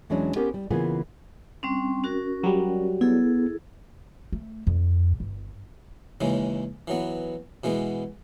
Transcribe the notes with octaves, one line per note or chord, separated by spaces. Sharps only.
E2 E3 F#3 G#3 C#4 D4
B3 C#4 G4 A#4 C5
G3
C#3 E3 A#3 B3 F4 G#4
G3 C4 C#4
C#4 F#4 A#4
F#3 G3
B3 E4 G#4 A4
A3
F2
G1
D#2 C#3 E3 G#3
E3 F#3 B3
B2 E3 G#3 B3